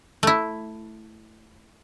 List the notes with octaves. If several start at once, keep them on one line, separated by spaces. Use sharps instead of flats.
A3 E4